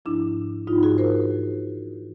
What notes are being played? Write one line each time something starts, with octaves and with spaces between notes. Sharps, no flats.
G#2 F3 D4 E4
G#2 F3 D#4 F4
F#4 G#4
A#4 C5
G#2 E3
E3